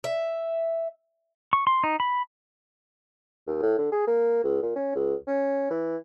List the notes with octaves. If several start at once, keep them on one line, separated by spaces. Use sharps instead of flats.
E5
C#6
C6
D#4
B5
D#2
A2
D3
G#4
A#3
C#2
A#2
C#4
C#2
C#4
E3